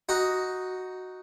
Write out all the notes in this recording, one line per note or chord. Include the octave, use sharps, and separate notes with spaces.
D#4 F#4